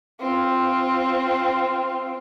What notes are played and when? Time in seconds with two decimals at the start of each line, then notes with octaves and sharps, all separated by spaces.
0.20 C4 F4